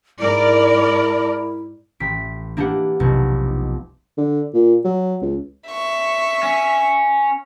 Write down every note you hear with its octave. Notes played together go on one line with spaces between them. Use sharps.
G#2 E4 A#4 D5
A1 G5 B6
A#3 D4 E4 G4 B4 F#5
F1 B1
D3
A#2
F#3
C#2
E5 C#6
C#4